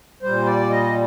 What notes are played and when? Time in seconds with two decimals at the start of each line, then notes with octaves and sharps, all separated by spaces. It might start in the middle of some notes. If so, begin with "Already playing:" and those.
0.23 A#2 G3 C5
0.46 D5
0.70 D#5